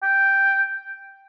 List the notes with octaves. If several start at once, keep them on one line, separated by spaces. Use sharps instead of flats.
G5